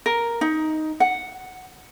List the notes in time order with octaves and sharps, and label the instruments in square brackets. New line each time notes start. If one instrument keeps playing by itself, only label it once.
[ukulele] A#4
D#4
F#5